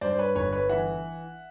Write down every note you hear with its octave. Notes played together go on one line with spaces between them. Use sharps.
G2 C5 D5
C5
B4 C#5
G1 B4 C#5
B4 C#5
E3 E5 F#5